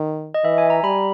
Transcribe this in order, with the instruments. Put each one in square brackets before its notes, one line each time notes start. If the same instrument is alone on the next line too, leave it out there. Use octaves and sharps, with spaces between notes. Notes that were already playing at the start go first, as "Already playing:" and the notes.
Already playing: [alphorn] D#3
[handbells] D#5
[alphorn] E3 [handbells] E5
[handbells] G#5
A#5
[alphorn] G3 [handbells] B5